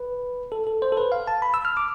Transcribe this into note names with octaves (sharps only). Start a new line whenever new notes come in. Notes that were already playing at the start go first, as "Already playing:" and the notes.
Already playing: B4
A4
A4
C5
A4
B4
F5
A5
B5
E6
F6
D6